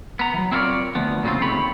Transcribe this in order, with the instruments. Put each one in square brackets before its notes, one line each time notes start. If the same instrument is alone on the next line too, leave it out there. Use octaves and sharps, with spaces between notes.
[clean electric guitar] B3 A#5
E3 F#3
C4 E4 F4 A#4 C#5 D5
D2 F3 B3
A#2 C#3 F#3 B3 C4 F4
F2 D#3 A3 G4 C#5 B5